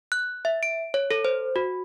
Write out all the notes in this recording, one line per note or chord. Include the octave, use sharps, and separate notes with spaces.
F#6
E5
D7
C#5
A4
C5
F#4